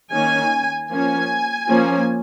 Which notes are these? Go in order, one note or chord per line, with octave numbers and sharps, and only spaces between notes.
D#3 A#3 C#4 G#5
F3 A#3 C#4 G#5
F3 A#3 C#4